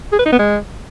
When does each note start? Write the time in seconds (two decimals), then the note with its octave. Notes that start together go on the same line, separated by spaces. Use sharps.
0.12 G#4
0.19 B4
0.26 D#4
0.32 B3
0.39 G#3